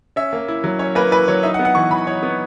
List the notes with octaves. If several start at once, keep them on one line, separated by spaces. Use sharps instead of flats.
C#4 E5
A#3
E4
F#3
C#4 C#5
A#3 B4
E4 B4
F#3 C#5
D#4 E5
F#5
B3
F#5
E3 C#6
E3 B5
D#4 C#5
B3